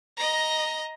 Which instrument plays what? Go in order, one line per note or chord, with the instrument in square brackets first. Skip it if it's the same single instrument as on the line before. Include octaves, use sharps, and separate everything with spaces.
[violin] D#5 A#5